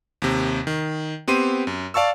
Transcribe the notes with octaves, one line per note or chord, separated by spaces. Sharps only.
D#2 C3
D#3
B3 C4 G4 C6 D#7
F#2
D5 F5 A5 C#6 E6